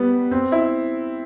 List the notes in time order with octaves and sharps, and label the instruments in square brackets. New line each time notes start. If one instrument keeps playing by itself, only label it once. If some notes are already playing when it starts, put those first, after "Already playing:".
Already playing: [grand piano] G3 B3
C4
E4